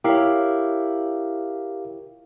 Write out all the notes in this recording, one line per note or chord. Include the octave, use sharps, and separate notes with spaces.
E4 G4 A#4 C#5 F5